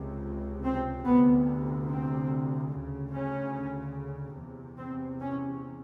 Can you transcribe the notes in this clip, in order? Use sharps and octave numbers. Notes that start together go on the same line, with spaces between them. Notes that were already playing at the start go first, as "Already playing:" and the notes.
Already playing: C#2 C3
C4
D2 C3 B3
C4
D2 C#3
C#4
E2 C3
C4
C#4